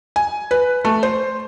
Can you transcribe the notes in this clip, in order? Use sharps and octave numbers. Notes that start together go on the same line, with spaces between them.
G#5
B4
A3
C5